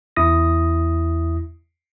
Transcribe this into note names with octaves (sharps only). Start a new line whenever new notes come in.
E2 E4 D#6 A#6